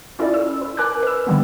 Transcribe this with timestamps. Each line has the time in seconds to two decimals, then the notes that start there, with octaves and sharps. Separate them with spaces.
0.19 C#4 E4 F4 A4 D5
0.34 E6
0.61 B4
0.77 A#4 G#5 D6 F#6
1.03 B4 E6
1.27 D3 D#3 G3 A#3 B3